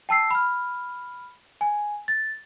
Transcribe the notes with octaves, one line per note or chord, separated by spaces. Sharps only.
G5 A5 E6 C7
B5 F6
G#5
A6